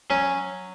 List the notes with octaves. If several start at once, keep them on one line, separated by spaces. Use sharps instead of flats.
F#3 C#4